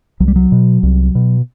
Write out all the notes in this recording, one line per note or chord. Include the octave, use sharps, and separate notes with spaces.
C2 F#3
G3
F#3
B2
C2
B2